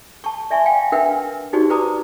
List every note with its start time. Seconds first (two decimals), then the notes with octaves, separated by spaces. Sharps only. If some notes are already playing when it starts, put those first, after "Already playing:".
0.24 A5 C#6
0.51 D5 E5 G#5 C6 C#6
0.66 F5 G5 G#5
0.92 D4 A#4 B4 E5 F#5 G5
1.53 D#4 F#4 G4 C5 D5
1.70 B4 C5 D5 A#5 D6 D#6